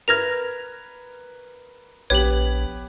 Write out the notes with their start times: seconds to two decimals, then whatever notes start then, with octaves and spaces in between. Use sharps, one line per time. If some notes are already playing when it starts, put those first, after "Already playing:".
0.08 A#4 B4 F6 G#6 A#6 F7
2.10 A#1 B3 G4 B4 C#5 F#7